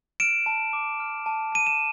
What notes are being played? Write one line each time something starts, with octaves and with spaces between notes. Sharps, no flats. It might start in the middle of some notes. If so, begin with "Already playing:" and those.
F6 D7 E7
A5
D6
F6
A5
A5 D#7
E7